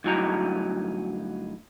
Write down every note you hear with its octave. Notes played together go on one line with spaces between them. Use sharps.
D2 G2 F#3 D#4 E4 A#5